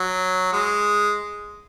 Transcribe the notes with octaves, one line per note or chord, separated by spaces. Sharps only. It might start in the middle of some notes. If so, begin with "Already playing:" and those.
Already playing: F#3
G#3